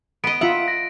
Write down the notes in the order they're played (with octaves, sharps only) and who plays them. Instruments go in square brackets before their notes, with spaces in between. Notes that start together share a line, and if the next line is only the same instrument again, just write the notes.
[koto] B3 D#5 [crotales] D7
[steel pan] F4 E5 [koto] F#5 A#5
[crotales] A#6